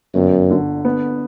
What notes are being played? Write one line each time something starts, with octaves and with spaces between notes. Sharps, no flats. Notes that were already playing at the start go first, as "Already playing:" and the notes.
G1 F#2
D3
B3